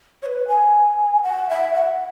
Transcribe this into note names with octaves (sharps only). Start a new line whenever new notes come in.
C#5
B4
G#5
F#5
E5
F#5